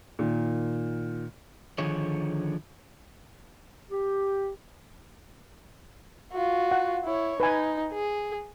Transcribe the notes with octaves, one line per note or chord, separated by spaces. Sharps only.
A#2 D#3
D3 D#3 F3 G#4 C#5
G4
F4 F#4
F#5
E4 C#5
D#4 B4 G#5
G#4